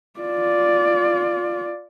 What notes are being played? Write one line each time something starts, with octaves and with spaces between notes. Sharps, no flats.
F4 D5